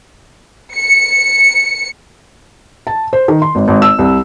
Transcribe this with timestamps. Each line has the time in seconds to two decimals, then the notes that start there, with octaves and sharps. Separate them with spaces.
0.74 C#7
2.87 A5
3.13 C5
3.28 D#3
3.42 C6
3.55 G#1
3.68 G#1
3.82 E6
3.99 C2